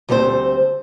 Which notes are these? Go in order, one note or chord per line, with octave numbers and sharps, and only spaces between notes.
D2 G3 A3 C4 C5